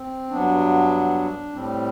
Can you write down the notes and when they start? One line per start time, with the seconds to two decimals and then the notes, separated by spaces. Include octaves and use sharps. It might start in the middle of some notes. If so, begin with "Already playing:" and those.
Already playing: C4
0.30 G2 F#3 B3 D4
1.52 A2 G3 C4